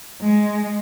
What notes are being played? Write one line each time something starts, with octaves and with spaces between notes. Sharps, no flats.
G#3